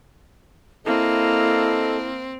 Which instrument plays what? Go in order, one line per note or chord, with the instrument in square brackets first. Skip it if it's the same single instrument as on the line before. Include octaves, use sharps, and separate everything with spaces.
[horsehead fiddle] A#3 [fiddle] C4 [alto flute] E4 [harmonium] A4 D#5 A5